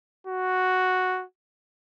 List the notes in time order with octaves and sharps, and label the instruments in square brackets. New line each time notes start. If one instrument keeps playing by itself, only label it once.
[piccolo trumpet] F#4